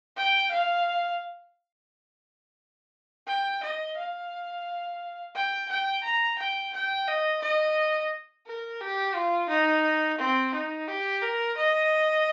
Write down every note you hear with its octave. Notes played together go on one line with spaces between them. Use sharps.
G5
F5
G5
D#5
F5
G5
G5
A#5
G5
G5
D#5
D#5
A#4
G4
F4
D#4
C4
D#4
G4
A#4
D#5